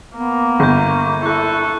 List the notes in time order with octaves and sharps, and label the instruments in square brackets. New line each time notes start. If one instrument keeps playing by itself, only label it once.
[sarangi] A#3 [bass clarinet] B3
[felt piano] G1 [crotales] C#6 G6
[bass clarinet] E4 [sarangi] A4 [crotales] C#6 F#6